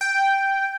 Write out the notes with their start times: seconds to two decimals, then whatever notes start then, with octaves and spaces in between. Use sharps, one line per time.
0.01 G5